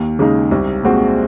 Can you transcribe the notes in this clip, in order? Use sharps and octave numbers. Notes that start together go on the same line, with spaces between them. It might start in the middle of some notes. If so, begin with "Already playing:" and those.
Already playing: D#2
C#3 G#3 D#4
C2
A#2 G#3 C4 F#4